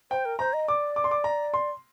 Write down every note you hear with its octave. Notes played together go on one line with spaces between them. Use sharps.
C5 G5
A#4
C5 A#5
D#5
D5 D6
D6
C6
D6
A#5
C6